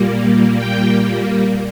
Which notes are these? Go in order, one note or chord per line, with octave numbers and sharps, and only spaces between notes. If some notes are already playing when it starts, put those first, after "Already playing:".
Already playing: A#2 G3 A#3
G5